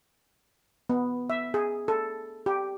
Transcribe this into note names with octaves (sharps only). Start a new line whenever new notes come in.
B3
E5
G#4
A4
G4